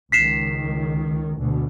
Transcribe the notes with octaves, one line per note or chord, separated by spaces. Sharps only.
C#2 D#3 B6 C7 E7
D2 B2